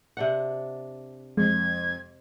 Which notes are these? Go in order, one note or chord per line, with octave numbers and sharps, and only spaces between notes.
C3 D4 F#5
F2 G#3 G#6